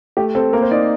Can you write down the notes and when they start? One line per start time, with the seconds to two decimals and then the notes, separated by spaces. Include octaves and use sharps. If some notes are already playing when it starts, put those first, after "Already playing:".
0.17 A3 G4
0.35 C4 A4
0.53 A#3 A#4
0.62 C5
0.71 D#4 D5